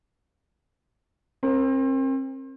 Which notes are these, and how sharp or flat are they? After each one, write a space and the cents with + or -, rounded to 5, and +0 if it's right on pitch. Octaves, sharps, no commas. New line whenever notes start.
C4 +35 A#4 +0